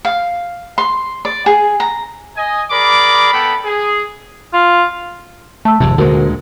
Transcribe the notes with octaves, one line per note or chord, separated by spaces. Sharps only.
F5
C6
D5
G#4
A#5
D#5 G#5
G#4 A#4 D5 B5 D6
B3 A4 G5 B5
G#4
F4
A3 A5 E6
G#1 F2 G#2 C3
D2 A#2 D3 G#3 F#4 A#4 C5